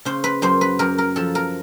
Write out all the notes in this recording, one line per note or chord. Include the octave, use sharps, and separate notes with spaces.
C#3 C5
B4
F#2 C5
B4
F#2 A#4
A#4
F3 A4
A#4